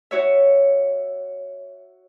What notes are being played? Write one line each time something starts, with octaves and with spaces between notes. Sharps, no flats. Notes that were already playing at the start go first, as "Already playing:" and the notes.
F#4 C#5 E5